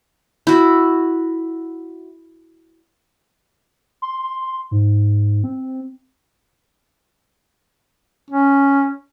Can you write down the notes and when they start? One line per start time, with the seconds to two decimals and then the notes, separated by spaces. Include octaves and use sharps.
0.47 E4 F#4
4.02 C6
4.23 C6
4.71 G#2
5.44 C4
8.31 C#4